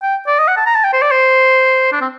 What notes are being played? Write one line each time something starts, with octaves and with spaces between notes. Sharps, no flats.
G5
D5
D#5
F#5
A5
A#5
A5
G5
C5
D5
C5
D4
C4